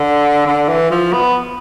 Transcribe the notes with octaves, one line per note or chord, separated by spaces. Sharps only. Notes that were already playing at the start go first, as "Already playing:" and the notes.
Already playing: D3
D3
E3
F3
B3